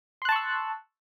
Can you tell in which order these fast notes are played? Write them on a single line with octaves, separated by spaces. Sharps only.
C6 F#6 A5 C#6 E6